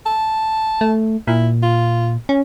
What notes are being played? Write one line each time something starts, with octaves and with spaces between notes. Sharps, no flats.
A5
A3
A#2 E4
F4
C#4